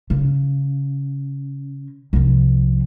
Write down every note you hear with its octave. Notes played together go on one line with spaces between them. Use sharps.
C#3
C2 F3